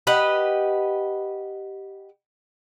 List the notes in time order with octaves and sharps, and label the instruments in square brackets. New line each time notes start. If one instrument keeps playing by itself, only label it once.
[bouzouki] G4 B4 D#5 F#5